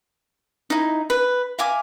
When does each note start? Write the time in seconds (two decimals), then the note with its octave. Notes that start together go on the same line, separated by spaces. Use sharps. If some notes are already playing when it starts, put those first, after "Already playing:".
0.70 D#4 E4
1.10 B4
1.59 E5 F5 G#5 D6